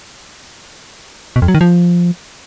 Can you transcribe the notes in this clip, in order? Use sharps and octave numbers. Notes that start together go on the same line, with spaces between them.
B2
F2
F#3
D#3
F3